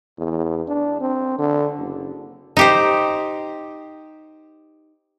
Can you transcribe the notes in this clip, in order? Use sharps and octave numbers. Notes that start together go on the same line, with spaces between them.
E2
D4
C4
D3
F#1
D#4 G4 C5